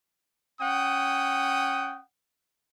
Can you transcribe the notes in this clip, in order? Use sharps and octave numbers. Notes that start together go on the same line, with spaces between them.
C#4 F#5 G5 D#6